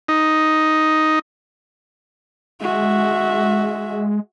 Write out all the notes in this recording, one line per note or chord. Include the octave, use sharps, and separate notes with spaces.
D#4
G#3 F#4 E5